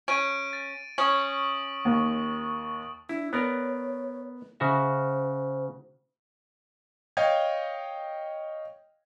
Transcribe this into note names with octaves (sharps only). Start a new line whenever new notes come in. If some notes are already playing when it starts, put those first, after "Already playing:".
C#4 D7 D#7
A6
C#4 C#6 D#6 F#7
D#2
D4 E4
B3 A#4 C#5 D5
C#3 F#4 C5 E5
C#5 D#5 F5 G5 G#6